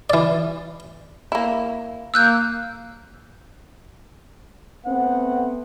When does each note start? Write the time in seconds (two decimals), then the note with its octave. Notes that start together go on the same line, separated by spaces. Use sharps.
0.10 E3 D5
1.32 A#3 E4
2.14 A#3 E6 F#6 G6
4.85 A3 B3 C4 F#5